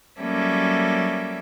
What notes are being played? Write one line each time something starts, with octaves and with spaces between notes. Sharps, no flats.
F#3 G3 A#3 C#4 A4 E5